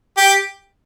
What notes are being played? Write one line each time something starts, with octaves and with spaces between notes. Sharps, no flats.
G4